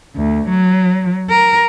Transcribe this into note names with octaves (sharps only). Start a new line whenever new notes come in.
D2
F#3
A#4